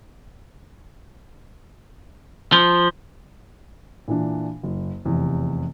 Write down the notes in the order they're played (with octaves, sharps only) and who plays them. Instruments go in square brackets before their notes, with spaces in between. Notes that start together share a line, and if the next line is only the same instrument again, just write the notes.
[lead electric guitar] F3
[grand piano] A#2 E3 D4
F#1
F1 E2 C3